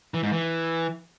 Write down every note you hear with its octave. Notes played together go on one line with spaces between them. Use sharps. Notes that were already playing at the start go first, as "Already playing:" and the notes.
E3
G#2
E3